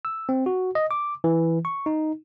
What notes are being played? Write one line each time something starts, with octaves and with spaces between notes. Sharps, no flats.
E6
C4
F#4
D#5
D6
E3
C#6
D#4